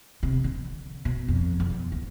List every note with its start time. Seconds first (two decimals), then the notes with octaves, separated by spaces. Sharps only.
0.23 C3
0.44 D3
1.05 B2
1.28 F2
1.60 E2
1.92 D2